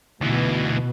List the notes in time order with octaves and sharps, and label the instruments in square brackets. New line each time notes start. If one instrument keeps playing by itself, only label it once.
[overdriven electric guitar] D2 E3 [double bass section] B2